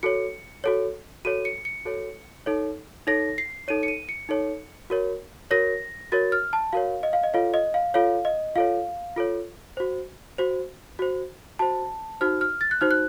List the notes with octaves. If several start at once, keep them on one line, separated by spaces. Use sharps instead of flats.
F#4 A4 C#5 C#7
F#4 A4 C#5
F#4 A4 C#5 D#7
C#7
C#7
F#4 A4 C#5
D#4 A4 C#5
D#4 A4 C#5 A#6
C7
D#4 A4 C#5 D#7
C#7
D#7
C#7
D#4 A4 C#5
F#4 A#4 C#5
F#4 A#4 C#5 A#6
F#4 A#4 C#5 A6
F6
A5
F#4 A#4 C#5 F5
D#5
F5
D#5
F4 A4 C#5 F5
D#5
F5
F4 A4 C#5 F5
D#5
F4 A4 C#5 F5
F4 A4 C#5
F#4 C5
F#4 C5
F#4 C5
F#4 C5 A5
D#4 F#4 C5 F6
F6
A6
F#6
D#4 F#4 C5 F6
F#6